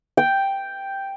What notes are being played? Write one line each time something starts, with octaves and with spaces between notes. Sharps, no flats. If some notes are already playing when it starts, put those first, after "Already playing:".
G5